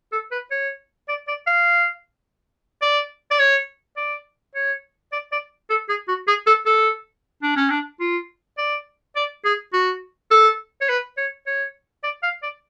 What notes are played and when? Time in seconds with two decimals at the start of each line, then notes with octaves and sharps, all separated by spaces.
0.12 A4
0.32 B4
0.51 C#5
1.09 D5
1.28 D5
1.47 F5
2.82 D5
3.31 D5
3.39 C#5
3.97 D5
4.55 C#5
5.12 D5
5.32 D5
5.70 A4
5.89 G#4
6.08 F#4
6.28 G#4
6.47 A4
6.66 A4
7.43 D4
7.56 C#4
7.70 D4
8.00 F4
8.58 D5
9.16 D5
9.45 G#4
9.73 F#4
10.31 A4
10.81 C#5
10.89 B4
11.18 C#5
11.47 C#5
12.04 D5
12.23 F5
12.43 D5